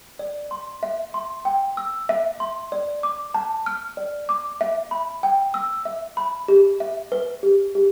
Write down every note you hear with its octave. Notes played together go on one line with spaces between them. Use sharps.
D5
C6
E5
C6
G5
E6
E5
C6
D5
D6
A5
F6
D5
D6
E5
B5
G5
E6
E5
B5
G4
E5
B4
G4
G4